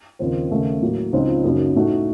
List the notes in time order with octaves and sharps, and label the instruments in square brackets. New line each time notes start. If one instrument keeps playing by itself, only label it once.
[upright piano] D#2 C#3 F3 C4
D#2 C#3 A3
A2 F#3 A#3
C#2 C#3 F3 C4 D#4
F#2 C#3 F#3 A#3 D#4
A2 A3 D#4 F#4